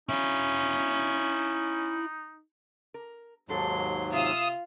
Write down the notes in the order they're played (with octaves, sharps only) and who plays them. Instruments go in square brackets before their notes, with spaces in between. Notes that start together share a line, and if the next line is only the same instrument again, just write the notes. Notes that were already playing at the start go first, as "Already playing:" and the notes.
[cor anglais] C#4 [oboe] D#4 [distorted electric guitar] E4 F5
[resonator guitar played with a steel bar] A#4
[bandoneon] D#2 G#2 F#3 [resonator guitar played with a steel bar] G4 A4 [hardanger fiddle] C6
[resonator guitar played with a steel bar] C3 E5 G#5 [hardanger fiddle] F4 F5 [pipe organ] D#6 E6